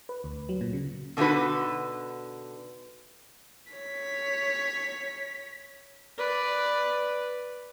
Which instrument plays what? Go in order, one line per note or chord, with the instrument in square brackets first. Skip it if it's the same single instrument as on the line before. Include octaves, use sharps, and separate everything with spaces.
[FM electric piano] B4
D2
F#3
A#2
C#3
[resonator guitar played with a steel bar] B2 D3 D#4 E4 F#4 B4
[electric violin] C#5 B6
[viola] B4 D5